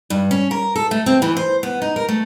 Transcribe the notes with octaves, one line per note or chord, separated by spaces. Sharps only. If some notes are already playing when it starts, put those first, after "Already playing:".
G2
C#4
A#4
A4
A3
C4
E3
C5
B3
D#4
A#4
A3